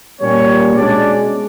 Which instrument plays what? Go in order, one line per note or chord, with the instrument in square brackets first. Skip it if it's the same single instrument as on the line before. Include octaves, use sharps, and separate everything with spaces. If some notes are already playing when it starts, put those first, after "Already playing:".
[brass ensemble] A#2 G3 A#3 C#4 C#5
B2 G#3 C#4 D4 D5